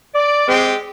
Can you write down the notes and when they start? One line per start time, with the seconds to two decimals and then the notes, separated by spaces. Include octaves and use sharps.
0.14 D5
0.48 G#3 C4 G4